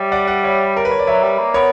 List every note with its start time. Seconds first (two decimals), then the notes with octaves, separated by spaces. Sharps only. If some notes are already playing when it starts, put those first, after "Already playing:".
Already playing: G3 C#5 E5
0.12 D5 F#5
0.27 D5 F#5
0.44 C#5 E5
0.77 A#4
0.85 B4
0.91 C#5
0.99 D5
1.07 F#3 C#5 E5
1.22 G3
1.39 A#3
1.54 B3 A#4 C#5